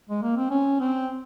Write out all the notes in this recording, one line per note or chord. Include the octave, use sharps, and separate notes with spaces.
G#3
A#3
C4
C#4
C4